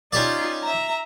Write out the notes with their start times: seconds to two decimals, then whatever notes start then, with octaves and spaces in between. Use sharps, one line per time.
0.13 C#4 D#4 F4 G4 D5
0.63 E5 A#5